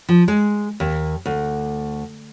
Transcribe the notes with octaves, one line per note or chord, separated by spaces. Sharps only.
F3
G#3
D#2
D2